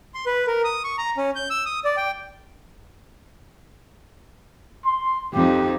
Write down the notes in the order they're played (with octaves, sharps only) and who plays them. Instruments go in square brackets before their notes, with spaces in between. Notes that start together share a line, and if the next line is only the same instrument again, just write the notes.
[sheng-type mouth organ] C6
B4
A#4
D#6
C#6
A#5
C#4
G6
E6
D#6
D5
G5
[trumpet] C6
[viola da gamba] F2 D#4 [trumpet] G4